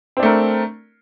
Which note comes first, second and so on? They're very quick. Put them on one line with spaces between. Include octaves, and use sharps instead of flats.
C4 D4 A3 A#4